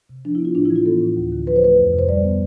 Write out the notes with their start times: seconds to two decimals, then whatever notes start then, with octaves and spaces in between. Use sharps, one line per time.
0.10 C3
0.25 F3 D4
0.35 E4
0.40 B3
0.45 F4
0.55 A2 D4
0.65 E4
0.70 E3
0.76 F4
0.86 B3 A4
1.01 A2
1.17 D2
1.32 D3
1.47 F3 B4
1.56 C5
1.63 A3 B4
1.78 F2
1.93 C3
1.99 C5
2.09 G3 D5
2.24 B3